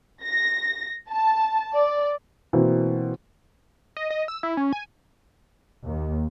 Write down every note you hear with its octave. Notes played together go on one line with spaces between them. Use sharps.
A#6
A5
D5
B2 E3 A#3 C4
D#5
D#5
E6
E4
C#4
G#5
D#2